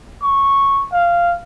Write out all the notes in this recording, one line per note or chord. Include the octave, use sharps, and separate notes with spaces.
C#6
F5